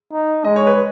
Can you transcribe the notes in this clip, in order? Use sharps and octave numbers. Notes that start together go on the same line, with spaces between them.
D#4
G#3 D#5
C#5
B4